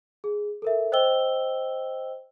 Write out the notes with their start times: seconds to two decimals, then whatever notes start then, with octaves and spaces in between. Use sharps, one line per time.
0.24 G#4
0.62 A4 A#4 E5
0.92 C5 D#5 G5 E6 G7